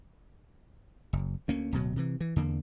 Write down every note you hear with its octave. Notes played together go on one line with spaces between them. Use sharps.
F#1
D2 A#3 C#4
D1 B2 F#3
C3 E3
E3
E2 D3 A#3